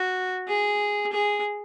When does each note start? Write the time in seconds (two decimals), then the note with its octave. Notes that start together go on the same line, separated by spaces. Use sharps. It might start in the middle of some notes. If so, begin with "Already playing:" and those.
Already playing: F#4
0.48 G#4
1.13 G#4